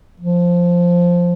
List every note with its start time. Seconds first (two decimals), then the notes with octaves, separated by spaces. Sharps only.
0.20 F3